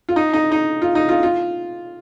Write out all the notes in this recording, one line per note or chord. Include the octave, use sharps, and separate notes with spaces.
F4
D#4
D#4
D#4
F4
D#4
F4
F4